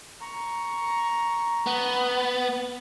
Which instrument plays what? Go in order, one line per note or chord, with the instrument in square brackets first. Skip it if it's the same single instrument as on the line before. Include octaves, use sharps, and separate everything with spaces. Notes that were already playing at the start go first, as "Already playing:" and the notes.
[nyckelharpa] A#5 C#6
[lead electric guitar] B3